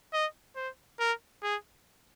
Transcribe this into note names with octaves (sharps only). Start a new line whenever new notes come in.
D#5
C5
A#4
G#4